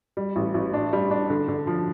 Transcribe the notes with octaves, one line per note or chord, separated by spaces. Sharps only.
G3
A1
A1
D4
G3
D4
D3
D3
F3